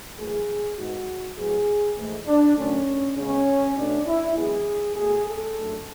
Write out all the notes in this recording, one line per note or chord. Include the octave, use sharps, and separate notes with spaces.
F#2 E3 A3 G#4
G#2 G#3 B3 F#4
A2 F#3 B3 G#4
G#2 E3 A3
D4
F#2 D3 A3 C#4
C#3 G#3 B3 C#4
B2 A3 D4
E4
F#2 E3 G#3 B3 G#4
B2 A3 G#4
A4
F#2 D3 A3